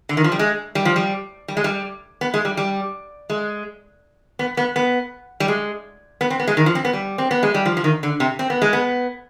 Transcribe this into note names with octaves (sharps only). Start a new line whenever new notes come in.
D3
D#3
F3
G3
G#3
G3
F3
G3
G3
G#3
G3
B3
G#3
G3
G3
G#3
B3
B3
B3
G3
G#3
B3
C4
B3
G#3
D#3
F3
C4
B3
G3
C4
B3
G#3
G3
F3
F3
D#3
D3
C3
C4
B3
G#3
B3